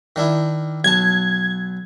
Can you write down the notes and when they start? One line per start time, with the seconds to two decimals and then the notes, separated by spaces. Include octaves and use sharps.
0.16 D#3 D4 E4
0.84 B1 A5 G#6